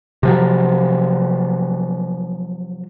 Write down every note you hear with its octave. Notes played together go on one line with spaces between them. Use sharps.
C3 F3 F#3